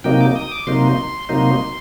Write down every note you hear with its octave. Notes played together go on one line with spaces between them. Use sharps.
C3 F#3 A#3 D#4 G5
D6
D#6
D6
C3 F#3 A#3 D#4 C6
C3 F#3 A#3 D#4 C6